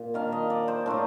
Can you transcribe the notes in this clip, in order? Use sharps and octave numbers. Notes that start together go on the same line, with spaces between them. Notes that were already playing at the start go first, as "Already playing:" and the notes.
Already playing: A#2
D#3 A#3 D4 F5
D#5
D5
C5
A2 A3 D4 A#4